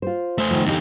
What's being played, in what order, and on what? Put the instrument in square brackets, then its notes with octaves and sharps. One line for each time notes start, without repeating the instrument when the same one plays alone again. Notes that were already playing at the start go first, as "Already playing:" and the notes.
[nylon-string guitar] F4 C5
[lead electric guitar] A3 C5
[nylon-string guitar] D#3 F3
[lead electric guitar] E2 G4 [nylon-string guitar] D3 D#4